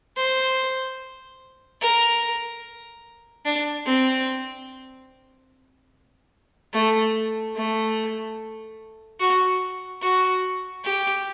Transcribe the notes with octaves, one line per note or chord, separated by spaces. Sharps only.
C5
A#4
D4
C4
A3
A3
F#4
F#4
G4